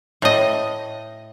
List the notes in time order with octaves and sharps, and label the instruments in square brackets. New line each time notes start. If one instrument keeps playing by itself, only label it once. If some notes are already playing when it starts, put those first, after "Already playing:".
[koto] A2 D#5